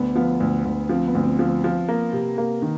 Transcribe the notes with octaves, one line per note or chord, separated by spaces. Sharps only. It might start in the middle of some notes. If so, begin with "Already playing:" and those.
Already playing: D2 B3
F3 B3
D2
D2
F3 C4
B3
D2
C4
F3
F3
A#3
C3
A#3
D#3